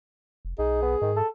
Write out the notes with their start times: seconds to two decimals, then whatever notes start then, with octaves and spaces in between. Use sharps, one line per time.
0.45 F1
0.59 B1 D#4 G#4
0.82 B3
1.02 G#2 D#3
1.16 A4